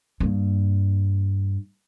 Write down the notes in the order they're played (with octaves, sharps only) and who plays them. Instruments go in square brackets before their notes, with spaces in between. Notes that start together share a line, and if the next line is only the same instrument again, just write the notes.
[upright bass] G2 A#3